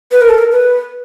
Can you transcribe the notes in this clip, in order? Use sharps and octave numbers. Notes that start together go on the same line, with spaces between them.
B4
A#4
A4
A#4
B4